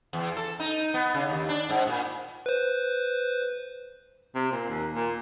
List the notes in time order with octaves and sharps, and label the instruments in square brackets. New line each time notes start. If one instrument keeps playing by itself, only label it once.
[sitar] E2
A4
D#4
B3
C#3
D#2
D4
G#2
A#2
[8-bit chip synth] B4 C5
[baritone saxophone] C3
A#2
D#2
A#2